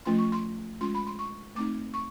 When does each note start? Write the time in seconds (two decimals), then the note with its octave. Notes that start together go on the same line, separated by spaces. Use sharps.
0.05 F3 A3 C#4 F4 C6
0.18 C#6
0.32 C6
0.81 G#3 C#4 F4 C6
0.95 B5
1.07 C6
1.19 C#6
1.55 A3 C4 D#4 D6
1.94 C#6